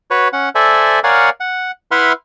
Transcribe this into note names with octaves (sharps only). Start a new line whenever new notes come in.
F#4 B4 C#5
C#4 F#5
A4 C5 D5 E5 G#5
A#4 C#5 D5 F5 F#5 G#5
F#5
E4 B4 E5 F#5 C6 F6